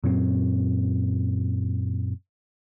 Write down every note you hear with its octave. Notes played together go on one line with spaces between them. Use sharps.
F#2 A#2 F#3 C4